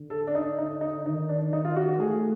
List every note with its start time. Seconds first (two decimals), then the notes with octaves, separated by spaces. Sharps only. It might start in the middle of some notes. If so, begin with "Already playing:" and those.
Already playing: D3
0.10 A4
0.27 D4
0.35 D#4
0.59 D#4
0.81 D#4
1.05 D#3 D#4
1.29 D4
1.53 D#3 D#4
1.65 F4
1.76 F#4
1.88 F#4
2.00 A3 G#4